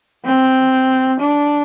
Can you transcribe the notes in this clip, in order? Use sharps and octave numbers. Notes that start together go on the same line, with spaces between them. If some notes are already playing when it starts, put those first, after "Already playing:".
C4
D4